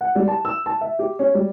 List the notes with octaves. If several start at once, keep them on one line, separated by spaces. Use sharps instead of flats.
F#5
G3
A5
E6
A5
E5
G4
C#4
G3